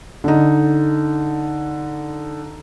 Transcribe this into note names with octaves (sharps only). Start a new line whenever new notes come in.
D3 D#4